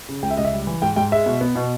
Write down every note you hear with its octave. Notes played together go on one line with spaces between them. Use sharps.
C#3
C#2 G5
E5
C#2 D#5
E5
G3
E3
G#2 G5
G#2 G5
G#3 E5
B2
B3
B2